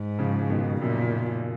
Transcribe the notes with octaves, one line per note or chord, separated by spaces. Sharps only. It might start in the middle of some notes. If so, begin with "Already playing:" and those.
Already playing: G#2
C#3 F3
B2 D#3
F#2 A#2